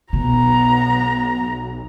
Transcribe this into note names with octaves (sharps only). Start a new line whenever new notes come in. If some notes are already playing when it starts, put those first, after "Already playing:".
B1 B2 B3 A#5